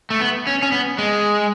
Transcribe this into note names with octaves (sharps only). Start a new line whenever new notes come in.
A3
B3
C#4
C#4
B3
G#3